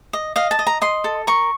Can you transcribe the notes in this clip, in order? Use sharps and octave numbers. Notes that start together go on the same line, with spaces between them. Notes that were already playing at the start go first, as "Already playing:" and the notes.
D#5
D#5 F5
A5
D#5
A#5
D#5 C6
A4
A#4 C#6